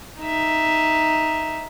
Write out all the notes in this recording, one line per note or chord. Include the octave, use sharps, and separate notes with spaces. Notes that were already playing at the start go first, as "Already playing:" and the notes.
D#4 E5